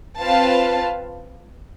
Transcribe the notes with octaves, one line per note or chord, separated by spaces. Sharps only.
C4 F4 B4 F5 A5